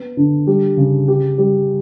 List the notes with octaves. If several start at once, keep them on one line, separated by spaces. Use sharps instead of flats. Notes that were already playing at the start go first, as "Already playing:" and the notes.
Already playing: B3
D3
G3
C#3
G4
G3